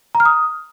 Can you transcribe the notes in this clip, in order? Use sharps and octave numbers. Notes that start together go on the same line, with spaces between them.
A#5
F6
D#6